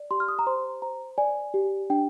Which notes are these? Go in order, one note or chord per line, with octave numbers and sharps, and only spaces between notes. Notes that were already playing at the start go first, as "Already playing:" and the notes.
Already playing: D5
G4 C6
F6
D#6
A#5
C5 C6
C5 A#5
D5 G#5
G4
D4 G5